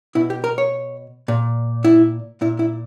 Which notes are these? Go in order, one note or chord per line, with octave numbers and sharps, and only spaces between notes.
B2 E4
G4
A#4
C#5
A#2
E4
A#2 E4
E4